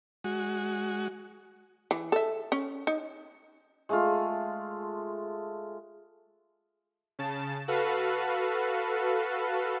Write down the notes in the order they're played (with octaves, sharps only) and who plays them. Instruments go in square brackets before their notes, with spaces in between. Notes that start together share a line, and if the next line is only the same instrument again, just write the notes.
[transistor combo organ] G#3 F#4
[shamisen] E3
A4 E5
C#4
D#4
[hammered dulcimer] G#3 A3 F4
[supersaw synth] C#3 A5
F#4 A4 B4 F5